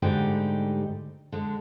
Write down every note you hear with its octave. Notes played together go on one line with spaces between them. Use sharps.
G#2 D3 G3 A3 D#4 G4
D3 G#3